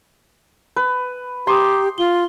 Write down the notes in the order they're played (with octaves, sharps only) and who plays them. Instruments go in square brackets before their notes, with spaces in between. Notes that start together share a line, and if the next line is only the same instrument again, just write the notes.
[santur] B4
[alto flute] G4 [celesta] A#5 D6 D#6 [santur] C6
[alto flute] F4 [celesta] G7